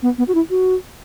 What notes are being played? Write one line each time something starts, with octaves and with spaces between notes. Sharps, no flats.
B3
B3
F#4
E4
F#4